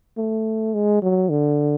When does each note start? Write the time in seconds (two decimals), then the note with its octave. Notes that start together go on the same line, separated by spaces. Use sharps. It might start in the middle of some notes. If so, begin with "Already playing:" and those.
0.18 A3
0.74 G#3
1.03 F#3
1.30 D3